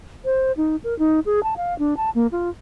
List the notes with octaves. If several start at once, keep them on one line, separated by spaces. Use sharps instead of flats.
C5
D#4
A#4
D#4
G#4
A5
F5
D4
A5
A#3
F4